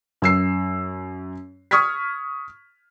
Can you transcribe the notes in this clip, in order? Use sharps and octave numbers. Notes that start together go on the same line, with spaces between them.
F#2 E6 C7
C#6 D#6 F6 G#6 B6